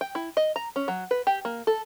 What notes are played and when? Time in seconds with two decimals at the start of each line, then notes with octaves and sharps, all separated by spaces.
0.01 G5
0.15 E4
0.37 D#5
0.56 A#5
0.76 C#4
0.88 F#3
1.11 B4
1.27 G4
1.45 A#3
1.67 A4